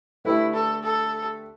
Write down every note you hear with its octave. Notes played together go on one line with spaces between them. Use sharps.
D3 A3 E4 G4 B4 E5
A4
A4